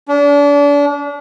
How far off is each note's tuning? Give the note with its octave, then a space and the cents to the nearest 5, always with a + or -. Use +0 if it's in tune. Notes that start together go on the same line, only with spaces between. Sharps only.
D4 -35